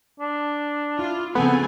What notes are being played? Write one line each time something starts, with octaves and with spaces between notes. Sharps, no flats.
D4
E4 F4
C#3 F3 A3 B3 C4 A4 G#5